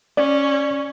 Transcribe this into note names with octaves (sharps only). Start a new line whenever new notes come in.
C#4 D5